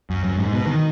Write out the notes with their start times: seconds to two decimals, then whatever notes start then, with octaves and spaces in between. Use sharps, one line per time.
0.10 F#2
0.24 F#2
0.39 G#2
0.53 B2
0.67 D#3